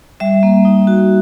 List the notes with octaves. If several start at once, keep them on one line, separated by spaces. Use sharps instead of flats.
G3 E5
A#3
D#4
F#4